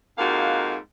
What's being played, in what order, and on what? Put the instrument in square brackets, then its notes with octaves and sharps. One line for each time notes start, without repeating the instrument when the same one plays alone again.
[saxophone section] F2 G#2 A#3 D#4 F#4 F5